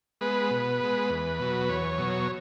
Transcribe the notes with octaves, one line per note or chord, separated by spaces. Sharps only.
G#3 B3 B4
B2
G#3 B3
E2
B2 F#3
E2 C#5
B2 F#3